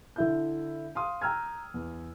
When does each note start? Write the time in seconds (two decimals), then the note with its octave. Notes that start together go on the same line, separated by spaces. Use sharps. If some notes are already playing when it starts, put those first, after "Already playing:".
0.16 D3 E4 G6
0.95 F5 C6 D#6
1.21 G5 A#5 E6 F6 G#6
1.74 E2